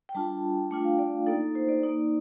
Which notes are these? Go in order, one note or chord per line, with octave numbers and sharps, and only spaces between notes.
G5
G3 D4 F4 A5
A3 D4 F4 G5
F5
D5
A#3 D#4 A4
C5
D5
A#3 D#4